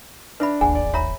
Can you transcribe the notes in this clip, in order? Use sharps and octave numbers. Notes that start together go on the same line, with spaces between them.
D4 B4 E5 B5
D1 G1 D#2 G#4 F#5 G#5
D5
C#5 E5 A#5 B5